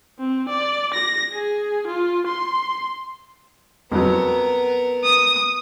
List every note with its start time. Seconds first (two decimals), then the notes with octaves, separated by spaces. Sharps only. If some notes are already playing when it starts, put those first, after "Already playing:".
0.20 C4
0.49 D5
0.94 A#6
1.33 G#4
1.87 F4
2.27 C6
3.92 F2 F#3 B3 A#4
5.04 D#6